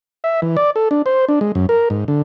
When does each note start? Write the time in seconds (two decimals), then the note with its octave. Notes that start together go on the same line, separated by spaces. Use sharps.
0.24 E5
0.42 E3
0.57 D5
0.76 A4
0.91 D4
1.06 C5
1.28 D4
1.41 G#3
1.55 F#2
1.69 A#4
1.90 G#2
2.08 D3